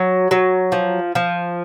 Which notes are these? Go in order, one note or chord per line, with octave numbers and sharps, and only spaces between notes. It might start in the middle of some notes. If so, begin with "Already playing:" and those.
Already playing: F#3
F#3
F3
F3